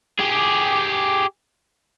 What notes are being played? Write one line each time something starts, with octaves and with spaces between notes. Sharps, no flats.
G4 G#4